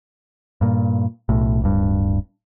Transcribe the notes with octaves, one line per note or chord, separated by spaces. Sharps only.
G2 A#2
B1 A2
D1 G2